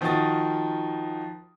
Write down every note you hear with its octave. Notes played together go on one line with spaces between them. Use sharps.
D#3 F3 D#4 F#4 D#6 A6